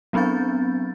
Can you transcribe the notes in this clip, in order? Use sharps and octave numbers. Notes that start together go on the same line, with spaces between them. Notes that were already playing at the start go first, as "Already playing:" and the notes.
F#3 B3 C4 D4 G6 A6